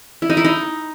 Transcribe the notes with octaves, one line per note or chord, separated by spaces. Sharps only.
E4
D#4
E4
D#4